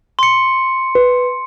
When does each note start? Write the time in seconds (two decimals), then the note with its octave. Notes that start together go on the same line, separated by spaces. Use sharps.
0.19 C6 C#7
0.95 B4